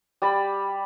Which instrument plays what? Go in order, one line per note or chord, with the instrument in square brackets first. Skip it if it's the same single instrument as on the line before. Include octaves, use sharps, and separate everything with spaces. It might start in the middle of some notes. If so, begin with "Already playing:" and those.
[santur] G3 D5 B5